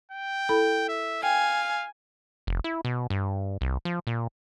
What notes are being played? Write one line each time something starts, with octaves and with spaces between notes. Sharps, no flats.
G5
E4 A4 B5
E5
F5 G5 G#5
F1
E4
B2
G2
C2
F3
A#2